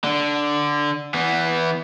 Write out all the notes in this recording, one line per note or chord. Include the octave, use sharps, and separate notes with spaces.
D3
E3 B3